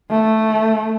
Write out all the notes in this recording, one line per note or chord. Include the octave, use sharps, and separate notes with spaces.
A3